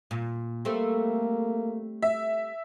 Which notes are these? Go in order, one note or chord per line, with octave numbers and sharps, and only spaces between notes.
A#2
G3 A3 A#3 C4
E5